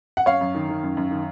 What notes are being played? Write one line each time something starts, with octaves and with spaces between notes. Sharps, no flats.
F#5
F#2 C#5 F5
F#2
D#3
D#3
F#2
F#2
D#3